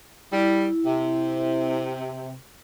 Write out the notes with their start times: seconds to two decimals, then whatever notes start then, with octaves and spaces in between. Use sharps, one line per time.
0.32 G3 E4
0.86 C3